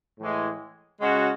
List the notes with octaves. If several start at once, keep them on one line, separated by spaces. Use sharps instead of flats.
A2 E3 G#3
C#3 G#3 C#4 F#4